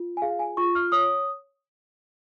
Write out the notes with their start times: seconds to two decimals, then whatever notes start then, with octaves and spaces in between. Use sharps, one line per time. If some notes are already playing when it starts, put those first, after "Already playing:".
Already playing: F4
0.17 G#5
0.22 G#4 F5
0.39 G#5
0.57 F4 C#6
0.75 F6
0.92 C#5 D#6